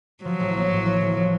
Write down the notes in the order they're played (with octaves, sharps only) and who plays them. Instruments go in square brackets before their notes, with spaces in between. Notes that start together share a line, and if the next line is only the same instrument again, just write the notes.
[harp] F3 [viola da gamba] F#3
[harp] A1
A#3
A2
F3
A1
F3